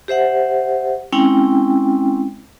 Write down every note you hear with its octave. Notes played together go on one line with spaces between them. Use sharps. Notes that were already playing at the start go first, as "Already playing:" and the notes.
G4 C5 E5 F#5
G#3 C4 C#4 E4 G5